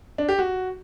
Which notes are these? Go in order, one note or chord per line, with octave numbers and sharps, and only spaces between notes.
D4
G4
F#4